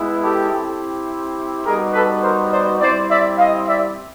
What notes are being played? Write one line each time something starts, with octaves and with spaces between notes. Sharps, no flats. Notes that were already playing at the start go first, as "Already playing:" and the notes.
Already playing: G#3 B3 E4
G4 A4
C4 E4 G4
G3 B3 D#4 F#4 G#4 A#4
A4 B4
A#4 C5
C5 D5
G3 C4 E4 C5 D5
D5 E5
D#5 F5
D5 E5